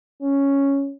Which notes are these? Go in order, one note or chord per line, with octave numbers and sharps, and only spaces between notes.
C#4